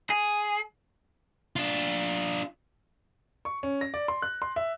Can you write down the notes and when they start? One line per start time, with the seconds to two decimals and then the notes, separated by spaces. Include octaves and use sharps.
0.10 G#4
1.56 D4 F4
3.45 C#6
3.63 C#4
3.81 A#6
3.94 D5
4.08 C6
4.22 F#6
4.42 C6
4.56 E5